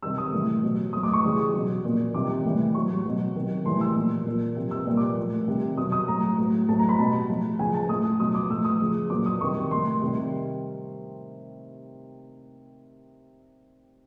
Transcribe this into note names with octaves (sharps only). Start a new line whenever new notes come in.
C3 D#3 G3 E6
D#6
A2 E3 G3
B2 F#3
A2 F#3 D#6
D6
C#6
C#3 E3 G3 D#6
B2 F#3
A#2 F3
C3 D#3 G3 D6
A2 E3 G3
A2 F#3 C#6
B2 F#3
C3 D#3 F#3
A2 E3 G3 C6
E6
A#2 F3
A#2 F3
C3 F3
E6
A#2 G3
D6
A2 F3
C3 D#3 G3
B2 F#3 D#6
D#6
A2 F#3 A#5
A2 F#3
A2 F#3 A5
A#5
B5
B2 G3 A5
A2 F3
C#3 F3 G#5
A5
A2 F3 D#6
B2 F#3 D#6
D6
A2 F3 E6
D#6
C#3 F3
A#2 F#3 D6
D#6
C3 D#3 G3 C#6
A2 F3 C6
C3 D#3 G3